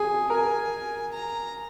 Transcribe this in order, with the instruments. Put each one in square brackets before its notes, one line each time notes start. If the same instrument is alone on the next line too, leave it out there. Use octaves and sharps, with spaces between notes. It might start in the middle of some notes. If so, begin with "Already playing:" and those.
Already playing: [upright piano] G#4 [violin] G#5
[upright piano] A#4 [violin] G#5
[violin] A#5